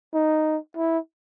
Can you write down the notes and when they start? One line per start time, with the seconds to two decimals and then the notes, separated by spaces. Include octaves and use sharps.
0.14 D#4
0.77 E4